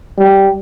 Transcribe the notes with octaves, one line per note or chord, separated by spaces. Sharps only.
G3